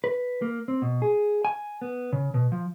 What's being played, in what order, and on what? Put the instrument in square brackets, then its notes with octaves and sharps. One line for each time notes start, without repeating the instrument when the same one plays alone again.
[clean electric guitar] B4
A#3
C4
B2
G#4
G#5
B3
C#3
B2
F3